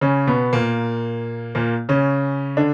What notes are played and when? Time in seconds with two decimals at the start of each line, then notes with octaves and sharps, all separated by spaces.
0.01 C#3 C#4
0.27 B2 B3
0.53 A#2 A#3
1.55 A#2 A#3
1.89 C#3 C#4
2.57 D3 D4